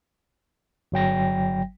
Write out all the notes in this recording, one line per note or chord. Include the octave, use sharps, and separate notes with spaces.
G1 F#3 G5 A#6